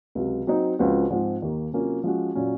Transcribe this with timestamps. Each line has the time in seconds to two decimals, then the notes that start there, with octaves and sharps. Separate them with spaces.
0.15 C#2 C3 F#3
0.47 F#3 C4 D#4
0.79 C#2 C#3 F3 C4 F#4
1.10 G#2 F3 C4 F4
1.42 D#2 D#3 A#3
1.72 C3 F#3 A#3 C#4 F4
2.04 F3 G#3 C#4 F#4
2.35 A#2 F#3 C#4